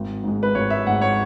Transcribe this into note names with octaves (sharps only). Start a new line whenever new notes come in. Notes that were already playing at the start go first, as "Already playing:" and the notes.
Already playing: G#1
G#2 G#3
B4
G#1 C#5
E5
G#2 G#3 F#5
C#5